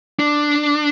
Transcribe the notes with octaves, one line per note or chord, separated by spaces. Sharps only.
D4